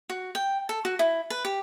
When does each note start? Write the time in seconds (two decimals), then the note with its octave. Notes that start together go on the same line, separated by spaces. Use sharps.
0.10 F#4
0.35 G5
0.69 A4
0.85 F#4
0.99 E4
1.30 B4
1.45 G4